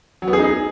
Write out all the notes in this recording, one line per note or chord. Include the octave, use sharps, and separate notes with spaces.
F#3
B3
G#4
D#4
G#4